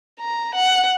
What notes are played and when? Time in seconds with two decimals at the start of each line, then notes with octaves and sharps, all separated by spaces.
0.20 A#5
0.55 F#5